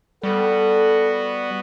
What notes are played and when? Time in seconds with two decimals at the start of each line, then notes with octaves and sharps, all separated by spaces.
0.23 G3 B3 F#4 A4